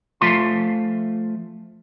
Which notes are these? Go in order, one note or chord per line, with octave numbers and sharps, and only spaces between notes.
F3 A3 F4 C6